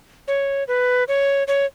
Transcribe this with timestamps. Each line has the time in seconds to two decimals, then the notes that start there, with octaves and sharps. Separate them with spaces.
0.28 C#5
0.68 B4
1.08 C#5
1.48 C#5